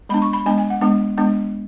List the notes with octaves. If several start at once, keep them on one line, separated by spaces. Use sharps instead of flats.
G#3 B3 D4 B5
C#6
B5
G#3 B3 D4 G#5
G#5
F#5
G#3 B3 D4
G#3 B3 D4